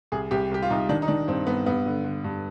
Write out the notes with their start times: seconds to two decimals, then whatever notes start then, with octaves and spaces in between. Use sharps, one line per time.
0.12 C2 G#4
0.31 C2 G4
0.51 C2 G4
0.63 F4
0.70 C2 D#4
0.89 D#3 D4
1.02 D#4
1.08 D#3 D4
1.28 G2 C4
1.47 G2 B3
1.66 G2 B3
1.86 D3
2.04 D3
2.24 G2